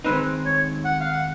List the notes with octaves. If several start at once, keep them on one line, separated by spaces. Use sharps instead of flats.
D#3 G#3 C4 D#4 B4
C#5
F#5
F5
F#5